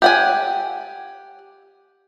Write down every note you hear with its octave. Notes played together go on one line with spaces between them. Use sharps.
G4 F#5 G#5